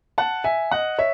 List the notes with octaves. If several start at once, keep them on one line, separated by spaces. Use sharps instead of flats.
F#5 A5
E5 G#5
D#5 F#5
C#5 E5